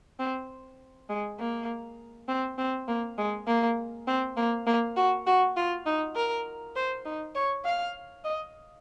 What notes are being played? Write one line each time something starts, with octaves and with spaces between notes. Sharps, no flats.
C4
G#3
A#3
C4
C4
A#3
G#3
A#3
C4
A#3
A#3
F#4
F#4
F4
D#4
A#4
C5
D#4
C#5
F5
D#5